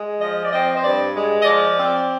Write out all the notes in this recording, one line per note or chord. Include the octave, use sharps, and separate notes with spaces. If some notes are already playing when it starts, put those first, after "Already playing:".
Already playing: G#3
F3 D#5
D5
C4 D#5
C5
G2 D5
G#3
D#5
F3 D5
C4